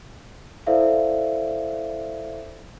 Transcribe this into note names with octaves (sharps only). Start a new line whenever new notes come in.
E4 A4 C5 D5 E5 F5